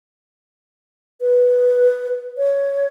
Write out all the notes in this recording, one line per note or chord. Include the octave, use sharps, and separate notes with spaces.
B4
C#5